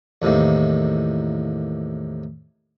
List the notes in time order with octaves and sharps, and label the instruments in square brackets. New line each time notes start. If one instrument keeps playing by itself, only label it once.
[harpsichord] E2 A2 C3 D#3 A#3